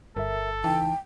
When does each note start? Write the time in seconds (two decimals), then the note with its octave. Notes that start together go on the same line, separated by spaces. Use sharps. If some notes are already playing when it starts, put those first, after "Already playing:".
0.16 G1 A4 A#4 E5
0.64 C#2 E3 D#4 G5 A5